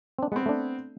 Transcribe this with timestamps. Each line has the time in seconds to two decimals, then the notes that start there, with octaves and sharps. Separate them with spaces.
0.19 C4 D4
0.32 G#3 B3 C4
0.46 A3 D4